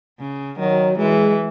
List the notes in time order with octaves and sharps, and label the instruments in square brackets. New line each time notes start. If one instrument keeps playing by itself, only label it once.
[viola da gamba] C#3
[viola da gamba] D#3 [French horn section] F#3
[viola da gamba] E3 [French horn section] G#3